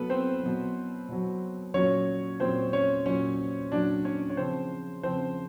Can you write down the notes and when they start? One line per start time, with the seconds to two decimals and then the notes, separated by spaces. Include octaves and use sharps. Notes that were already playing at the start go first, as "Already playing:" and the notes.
Already playing: B2 F#3 A3 B3 A4 B4
0.10 C4 C5
0.43 B2 F#3
1.09 B2 F#3
1.74 A#2 F#3 C#4 C#5
2.40 A#2 F#3 C4 C5
2.73 C#4 C#5
3.06 A#2 F#3 C#4 C#5
3.72 A#2 F#3 D4 D5
4.05 C#4 C#5
4.30 C#5
4.37 C#3 F3 C4 C5
5.03 C#3 F3 C4 C5